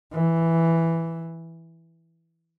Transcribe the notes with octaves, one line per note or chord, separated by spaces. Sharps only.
E3